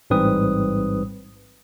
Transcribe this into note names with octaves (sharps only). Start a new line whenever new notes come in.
A1 G#2 G3 C4 B4 D#6